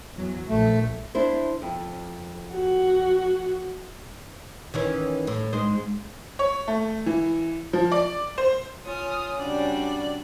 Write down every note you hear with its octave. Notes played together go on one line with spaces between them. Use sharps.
E2 F#3
A#1 A3
D4 E4 C5
F2
F#4
D#3 E3 C#4
A2
G#2 G#3 C5
C#5
A3
E3
F3
D5
C5
F4 C#5 G#5 D#6 F6
C#3 G3 D4 F#4 D5